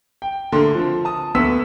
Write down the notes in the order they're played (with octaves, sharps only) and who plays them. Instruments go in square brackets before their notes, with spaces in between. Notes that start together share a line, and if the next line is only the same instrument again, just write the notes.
[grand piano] G5
D3 A3 A#3 C6
F3 C4
A5 D#6
D2 A#3 B3 C6 E6 B6